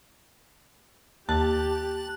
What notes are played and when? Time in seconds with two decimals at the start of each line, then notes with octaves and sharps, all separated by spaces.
1.29 D#2 G4 A5 F#6